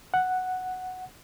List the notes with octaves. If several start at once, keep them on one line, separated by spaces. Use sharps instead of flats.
F#5